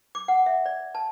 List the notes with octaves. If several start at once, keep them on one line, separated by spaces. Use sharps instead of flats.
D6
F#5
E5
D5
A5